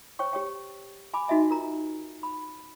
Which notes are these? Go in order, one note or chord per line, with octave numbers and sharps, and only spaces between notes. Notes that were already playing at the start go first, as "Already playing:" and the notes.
C5 C#5 G5 C#6
G4 C#5 G5
G#5 B5 D6
D#4 F#4 D#5 E5 G#5
F4 A#4 A#5
B5